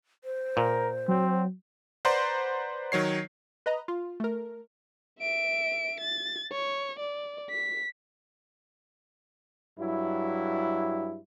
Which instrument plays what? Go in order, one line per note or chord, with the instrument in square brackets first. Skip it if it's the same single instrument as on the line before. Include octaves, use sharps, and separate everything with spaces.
[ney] C5
[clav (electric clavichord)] A#2 [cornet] A#4
[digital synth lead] F#3 [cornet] C4
[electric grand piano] B4 C5 D5 F#5 A#5 C6
D#3 F#3 C#5 C7
[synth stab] B4 D#5 A#5
F4
A3 A#4
[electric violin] E5 D7
A6
C#5
D5
B6
[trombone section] G2 F#3 E4